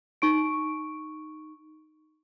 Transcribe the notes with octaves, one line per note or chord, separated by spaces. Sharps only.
D#4 C#6 D7